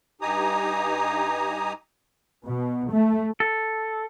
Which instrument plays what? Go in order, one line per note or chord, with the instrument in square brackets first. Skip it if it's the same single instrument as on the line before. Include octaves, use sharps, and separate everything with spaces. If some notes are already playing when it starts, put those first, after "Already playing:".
[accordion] G2 D#4 G4 G#5 A#5 D#6
[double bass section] B2
A3
[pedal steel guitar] A4